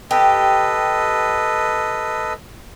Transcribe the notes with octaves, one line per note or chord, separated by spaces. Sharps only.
G4 A4 B4 D#5